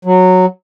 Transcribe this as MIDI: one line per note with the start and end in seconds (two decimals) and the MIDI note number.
0.05 0.46 54